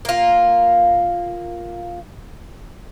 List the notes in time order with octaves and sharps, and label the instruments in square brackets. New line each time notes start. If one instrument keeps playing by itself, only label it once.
[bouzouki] A#3 F4